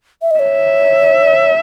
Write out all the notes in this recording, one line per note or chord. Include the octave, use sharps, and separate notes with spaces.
E5
D#5
C#5 E5